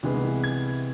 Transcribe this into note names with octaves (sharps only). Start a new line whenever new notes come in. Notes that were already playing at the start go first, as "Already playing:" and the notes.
C2 C3 E3 G#3 B3
G#6